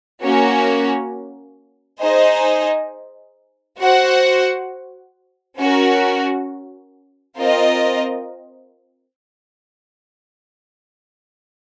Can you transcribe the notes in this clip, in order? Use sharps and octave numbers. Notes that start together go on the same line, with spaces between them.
A#3 C#4 F#4
D#4 G#4 C5 D#5
F#4 C5 F#5
C#4 F#4 A#4
C4 F4 A#4 D#5